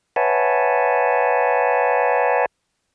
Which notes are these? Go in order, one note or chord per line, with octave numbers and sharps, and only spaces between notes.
B4 C#5 E5 F#5 G#5 A5